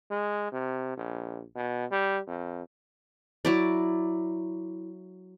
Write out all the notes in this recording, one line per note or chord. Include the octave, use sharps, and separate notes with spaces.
G#3
C3
A#1
B2
G3
F2
F#3 E4 D5